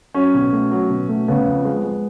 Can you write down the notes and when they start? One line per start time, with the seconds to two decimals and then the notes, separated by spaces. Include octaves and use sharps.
0.14 F#3 C#4
0.34 B2
0.52 A3
0.71 F#3
0.90 B2
1.08 A3
1.28 C#3 B3
1.46 F2
1.65 G#3
1.84 G#3